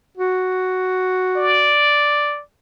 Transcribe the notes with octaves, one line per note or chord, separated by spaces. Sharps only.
F#4
D5